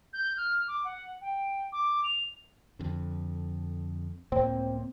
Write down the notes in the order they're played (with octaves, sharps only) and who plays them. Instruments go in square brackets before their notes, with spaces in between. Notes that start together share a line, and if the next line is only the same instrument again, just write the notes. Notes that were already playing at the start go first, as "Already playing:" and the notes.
[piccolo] G6
F6
D6
F#5
G5
D6
F7
[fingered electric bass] F2 D3
[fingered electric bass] C#2 A2 A#3 [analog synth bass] C4